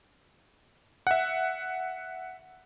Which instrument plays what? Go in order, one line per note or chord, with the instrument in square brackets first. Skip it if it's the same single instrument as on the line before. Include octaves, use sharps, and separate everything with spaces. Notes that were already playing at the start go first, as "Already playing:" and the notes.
[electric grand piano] E5 F#5